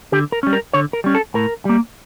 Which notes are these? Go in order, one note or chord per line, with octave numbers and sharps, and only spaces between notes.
D3 G4
A#4
G3 C#4
A#4
D3 C#5
A#4
G3 C#4
A4
A2 A#4
G3 A#3